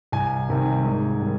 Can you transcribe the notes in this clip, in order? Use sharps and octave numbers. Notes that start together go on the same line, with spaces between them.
C2 G#5
C3 D#3 G3
G#2
D#3 G3